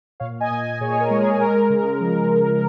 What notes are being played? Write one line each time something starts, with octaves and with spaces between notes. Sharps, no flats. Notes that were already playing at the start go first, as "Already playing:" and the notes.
A#2 C#5 F5
D#5 G#5
A#2
D#5 G#5
A#2 G#4 C#5
C#5
A#4
G#3
G#4
G#3 A#4
C#3
F3
C#3